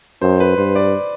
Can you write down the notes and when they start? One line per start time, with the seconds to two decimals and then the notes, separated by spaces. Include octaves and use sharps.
0.21 F#2 C5
0.40 B4
0.57 G2 C5
0.76 D5